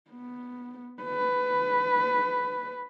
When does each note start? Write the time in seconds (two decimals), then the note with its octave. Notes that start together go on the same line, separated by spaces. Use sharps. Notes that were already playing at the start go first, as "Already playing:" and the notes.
0.11 B3
1.03 B4